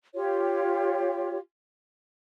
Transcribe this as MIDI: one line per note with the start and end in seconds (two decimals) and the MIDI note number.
0.15 1.38 65
0.15 1.38 67
0.15 1.38 73